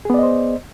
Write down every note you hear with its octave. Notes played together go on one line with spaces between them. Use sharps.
B3 G#4 C5 D5 D#5